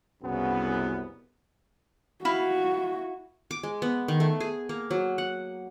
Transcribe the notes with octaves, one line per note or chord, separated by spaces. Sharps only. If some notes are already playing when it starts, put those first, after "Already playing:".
C2 F#2 C#3 B3
E4 F#4 F5
D6
G#3
B3
D#3
A3
G#4
A#3
F#3
F#5